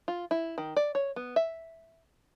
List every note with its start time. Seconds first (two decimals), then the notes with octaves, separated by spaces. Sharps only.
0.08 F4
0.31 E4
0.58 D#3
0.76 D5
0.95 C#5
1.16 B3
1.36 E5